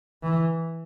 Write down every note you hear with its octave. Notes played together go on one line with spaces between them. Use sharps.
E3